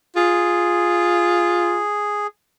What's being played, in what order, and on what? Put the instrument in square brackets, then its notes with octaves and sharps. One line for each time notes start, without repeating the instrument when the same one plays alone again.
[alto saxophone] F4 [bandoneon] G#4